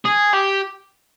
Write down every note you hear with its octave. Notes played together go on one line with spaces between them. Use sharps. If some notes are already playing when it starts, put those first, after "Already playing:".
G#4
G4